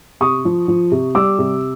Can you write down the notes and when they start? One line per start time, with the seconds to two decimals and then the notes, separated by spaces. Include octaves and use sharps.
0.21 C3 C#6 D#6
0.45 F3
0.68 F3
0.91 C3
1.15 G3 D6 E6
1.38 C3